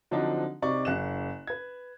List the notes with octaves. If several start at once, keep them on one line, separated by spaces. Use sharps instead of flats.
D3 F3 F#3 C4 D4 D#4
C3 D#4 D5 C#6 D6
F#1 F#6 E7
B4 G#6